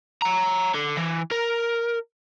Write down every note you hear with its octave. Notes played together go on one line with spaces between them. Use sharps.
C#5 A#5
D3
E3
A#4